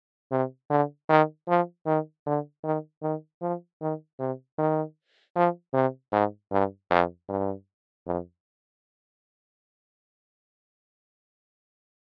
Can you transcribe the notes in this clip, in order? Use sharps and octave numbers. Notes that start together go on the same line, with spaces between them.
C3
D3
D#3
F3
D#3
D3
D#3
D#3
F3
D#3
C3
D#3
F3
C3
G#2
G2
F2
G2
F2